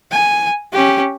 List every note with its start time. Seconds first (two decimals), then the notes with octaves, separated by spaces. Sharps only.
0.11 G#5
0.73 C#4 G4